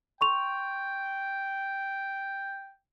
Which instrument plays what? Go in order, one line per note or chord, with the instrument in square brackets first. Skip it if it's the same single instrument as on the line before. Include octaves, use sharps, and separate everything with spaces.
[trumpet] G5 [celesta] C6 C#6 F7